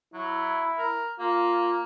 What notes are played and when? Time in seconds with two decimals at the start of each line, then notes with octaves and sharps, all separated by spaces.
0.14 F#3 E4
0.78 A#4
1.20 A#3 F4